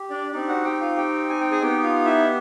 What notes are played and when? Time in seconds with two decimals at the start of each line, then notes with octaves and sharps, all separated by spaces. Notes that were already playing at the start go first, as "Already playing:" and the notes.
Already playing: G4
0.10 D4 D5
0.32 C4 D4 D#4 G4 D5
0.48 F#4 F#5
0.65 G4 G5
0.81 F4 F5
0.96 G4 G5
1.30 G#5
1.40 G5
1.51 G#4 G#5
1.62 B3 D#4 G4 G5
1.83 F4 F5
2.05 E4 E5